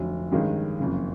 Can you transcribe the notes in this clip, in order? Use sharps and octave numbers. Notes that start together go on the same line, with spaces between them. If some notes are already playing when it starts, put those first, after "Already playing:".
Already playing: F1 F2 D3 F#3
G2 D#3 G#3 C#4
F#1 F2 C#3